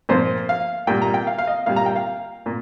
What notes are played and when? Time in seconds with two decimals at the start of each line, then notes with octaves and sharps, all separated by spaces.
0.09 A#2 F3 C5
0.49 F5
0.87 A#2 G3 G5
1.02 A#5
1.14 G5
1.27 F5
1.38 F5
1.47 D#5
1.66 A#2 G3 F5
1.76 A#5
1.86 G5
1.96 F5
2.46 A#2